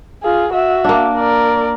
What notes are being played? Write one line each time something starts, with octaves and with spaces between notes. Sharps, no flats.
F4 G#4
F#4 E5
A#3 D4
A#4 D5